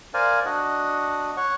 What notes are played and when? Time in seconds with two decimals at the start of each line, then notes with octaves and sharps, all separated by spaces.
0.14 A#4 C5 D5 F5 G#5
0.46 D4 F#4 D#5 F#5
1.37 C#5 F#5 C#6